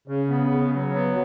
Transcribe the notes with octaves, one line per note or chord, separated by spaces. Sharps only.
C#3
B3
C#3
F#3
B3